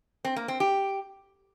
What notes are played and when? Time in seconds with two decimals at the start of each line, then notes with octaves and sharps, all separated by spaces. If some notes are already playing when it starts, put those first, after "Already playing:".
0.25 C4
0.36 A#3
0.48 C4
0.60 G4